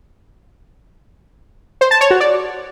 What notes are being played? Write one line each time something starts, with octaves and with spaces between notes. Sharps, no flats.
C5
A5
C#5
F#4
D5